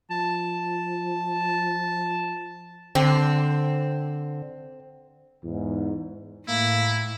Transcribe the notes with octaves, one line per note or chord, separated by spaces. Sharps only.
F3 A5
D3 C4
E2 G#2
A2 A#3 E4